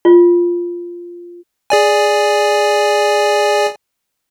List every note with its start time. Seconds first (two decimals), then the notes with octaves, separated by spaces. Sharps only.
0.05 F4
1.70 G#4 D5 G#5